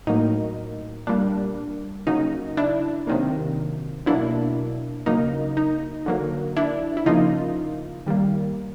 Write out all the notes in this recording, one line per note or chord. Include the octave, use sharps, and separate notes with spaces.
A2 F#3 A#3 D#4
A#2 G3 A#3 D4
C#3 F#3 A#3 D#4
D4 E4
C3 D#3 F#3 A#3
B2 F#3 A#3 D4 E4
C#3 F#3 A#3 D#4
D#4
D3 F#3 A#3
D4 E4
E4
C#3 F3 A#3 D#4 F4
D#3 G3 A#3